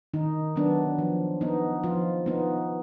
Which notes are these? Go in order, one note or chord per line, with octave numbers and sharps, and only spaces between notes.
D#3 D#4
F#3 B3 D4
F3
B3 D#4
F3 F4
B3 D#4